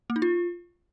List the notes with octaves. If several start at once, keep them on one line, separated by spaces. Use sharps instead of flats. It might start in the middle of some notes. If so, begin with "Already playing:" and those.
A#3
D#4
F4